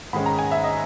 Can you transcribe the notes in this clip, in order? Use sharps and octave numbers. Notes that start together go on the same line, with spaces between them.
G#2 D#3 G#3 C#4 B5
A#5
G#5
E5
D#5